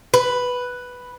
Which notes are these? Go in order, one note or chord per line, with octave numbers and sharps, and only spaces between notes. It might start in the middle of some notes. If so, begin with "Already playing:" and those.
B4